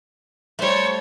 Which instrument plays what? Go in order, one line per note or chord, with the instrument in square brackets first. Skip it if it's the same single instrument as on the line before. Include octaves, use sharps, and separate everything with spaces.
[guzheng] G3 A3 [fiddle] C5 C#5